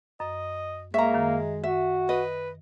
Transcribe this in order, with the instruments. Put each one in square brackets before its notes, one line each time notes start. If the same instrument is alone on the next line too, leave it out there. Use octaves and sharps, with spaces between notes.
[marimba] F#2 [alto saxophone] D#5
[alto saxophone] G#3 [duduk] A#3 [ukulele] E5 A#5 [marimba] C#6
[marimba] F#2 D#3
[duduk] F#4 [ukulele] E5
[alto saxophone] B4 [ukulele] D#5